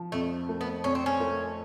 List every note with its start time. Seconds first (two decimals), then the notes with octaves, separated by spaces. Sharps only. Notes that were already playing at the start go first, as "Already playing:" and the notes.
Already playing: F3
0.12 F2 A3
0.49 A3
0.61 B3
0.84 F2 C#4
0.95 C4
1.06 C#4
1.20 A3